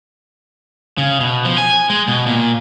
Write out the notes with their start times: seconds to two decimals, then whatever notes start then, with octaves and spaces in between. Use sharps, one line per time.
0.98 C#3
1.20 B2
1.45 F3
1.58 G#5
1.90 G#3
2.08 B2
2.26 A#2